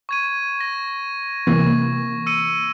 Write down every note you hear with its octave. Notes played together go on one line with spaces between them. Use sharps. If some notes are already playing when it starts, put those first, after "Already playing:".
C#6 G#6 D#7
A#6
C3 E3 A#3 C#6
E6 C#7 D#7